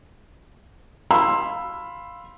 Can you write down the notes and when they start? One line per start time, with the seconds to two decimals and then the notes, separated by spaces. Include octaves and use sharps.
1.11 F5 B5 C6 E6